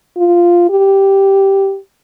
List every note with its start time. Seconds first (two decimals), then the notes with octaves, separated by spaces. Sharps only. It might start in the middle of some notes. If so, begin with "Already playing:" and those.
0.17 F4
0.70 G4